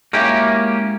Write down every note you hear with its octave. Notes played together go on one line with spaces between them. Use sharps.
G#3 A#3 C#4 E4 F#4 G4